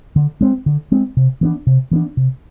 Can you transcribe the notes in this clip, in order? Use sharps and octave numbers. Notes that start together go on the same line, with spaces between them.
D3
G#3 C4
D3
G#3 C4
C3
E3 B3 D4
C3
E3 B3 D4
C3